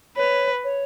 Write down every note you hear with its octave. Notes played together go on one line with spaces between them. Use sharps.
B4 C#5
C#5